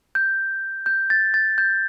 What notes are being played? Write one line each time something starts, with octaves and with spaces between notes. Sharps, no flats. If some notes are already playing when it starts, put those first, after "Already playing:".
G6
G6
A6
A6
G6